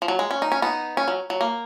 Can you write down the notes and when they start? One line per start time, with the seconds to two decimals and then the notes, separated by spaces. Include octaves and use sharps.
0.02 F3
0.08 F#3
0.19 G#3
0.31 C#4
0.42 D#4
0.52 C#4
0.62 B3 D#4
0.97 C#4
1.08 F#3
1.30 F#3
1.41 A#3